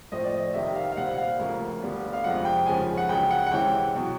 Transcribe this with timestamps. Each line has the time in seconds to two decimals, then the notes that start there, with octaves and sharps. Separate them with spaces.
0.12 A2 F3 A3 C4 D#5
0.24 D5
0.37 D#5
0.54 C2 C3 D#3 G3 E5
0.76 F5
0.92 F5
0.97 A#2 G3 C4 F#5
1.13 F#5
1.18 F5
1.39 D2 C#3 F3 A#3
1.82 D2 D3 G3 B3
2.13 F5
2.24 F2 C3 F3 G#3 F#5
2.45 G5
2.67 D#2 C#3 F3 G#3 C#4 G#5
2.98 F#5
3.09 C#2 C#3 F#3 G5
3.31 F#5
3.47 F#5
3.52 C3 E3 G#3 C#4 G5
3.95 B2 F#3